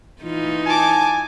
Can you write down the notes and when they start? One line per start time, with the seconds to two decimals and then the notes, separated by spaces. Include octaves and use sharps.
0.22 E3 D#4 F4
0.66 G#5 A5 D6